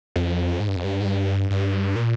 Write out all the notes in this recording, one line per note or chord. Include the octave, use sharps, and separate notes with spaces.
F2
G#2
G2
F2
G2
G#2
G2
G2
A#2